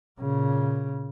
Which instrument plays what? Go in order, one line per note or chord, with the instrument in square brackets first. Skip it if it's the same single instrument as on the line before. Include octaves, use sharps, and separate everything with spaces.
[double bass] A#2 C#3